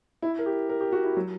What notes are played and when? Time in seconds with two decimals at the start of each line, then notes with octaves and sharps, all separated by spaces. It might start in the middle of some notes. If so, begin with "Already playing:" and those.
0.22 E4
0.39 A#4
0.46 G4
0.69 A#4
0.81 G4
0.92 F#4
1.04 E4
1.17 F#3